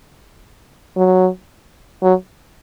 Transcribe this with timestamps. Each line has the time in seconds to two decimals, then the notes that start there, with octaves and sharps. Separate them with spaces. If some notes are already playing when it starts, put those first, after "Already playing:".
0.97 F#3
2.03 F#3